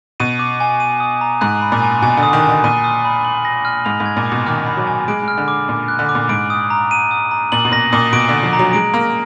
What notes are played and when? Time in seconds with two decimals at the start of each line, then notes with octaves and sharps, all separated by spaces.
0.20 B2 D#7
0.39 D6
0.60 G#5
0.80 D#7
1.00 D#6
1.21 A#5
1.41 G#2 F#6
1.61 B5
1.72 A#2
1.82 G#5
2.02 B2 G#5
2.17 D3
2.23 D#6
2.33 D#3
2.43 G#5
2.49 D3
2.64 A#2 D#7
2.84 D#6
3.05 B5
3.25 F#7
3.45 A#6
3.65 F6
3.85 G#2 F7
4.00 G#2
4.06 G#6
4.17 A#2
4.26 D6
4.32 B2
4.46 D#3 F6
4.67 B5
4.77 F#3
4.87 G#5
5.08 G#3 D7
5.22 G#3
5.28 F6
5.38 D3
5.48 D6
5.68 A#2 D6
5.88 F#6
5.99 D3
6.09 D6
6.15 A#2
6.29 G#2 D7
6.50 D#6
6.70 A#5
6.91 D#7
7.11 D#6
7.31 A#5
7.52 A#2 F#7
7.65 B2
7.72 A#2 A#6
7.92 A#2 D#6
8.13 B2 D7
8.29 D3 D#6
8.43 F3
8.53 A#5
8.59 F#3
8.73 G#3 D7
8.94 A#3 F6